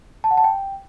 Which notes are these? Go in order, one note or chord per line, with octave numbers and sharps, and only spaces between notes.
A5
F#5
A5
G5